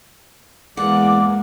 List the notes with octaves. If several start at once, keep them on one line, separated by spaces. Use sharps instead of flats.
E2 G#3 A#3 F#5 D6